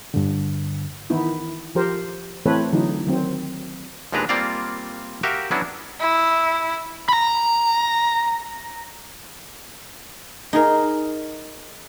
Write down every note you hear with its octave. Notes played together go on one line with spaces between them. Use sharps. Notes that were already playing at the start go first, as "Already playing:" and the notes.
G2 D3
D#3 E3 B3 D#4 E4
F3 G4 A#4 C5
E3 A3 C4 A4 B4 C#5
D3 E3 F#3 D#4
D#3 F#3 C4
D#2 A#2 G#3 D4 B4 A#5
G3 A#3 C4 F4 D5 F5
F#4 G4 A#4 E5 F5
F#3 B3 C#4 D4 E4 F#4
E4
A#5 B5
D#4 G#4 A#4